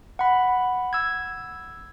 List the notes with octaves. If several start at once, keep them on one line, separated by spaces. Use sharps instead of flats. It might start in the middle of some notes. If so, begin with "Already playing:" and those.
F#5 B5
E6 G#6